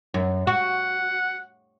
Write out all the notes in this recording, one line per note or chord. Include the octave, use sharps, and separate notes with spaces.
F#2
F#4 F#5